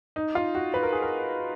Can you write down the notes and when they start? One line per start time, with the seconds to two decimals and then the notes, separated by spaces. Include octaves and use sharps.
0.16 D#4
0.35 F4
0.55 F#4
0.74 B4
0.83 A#4
0.93 G#4
1.02 A#4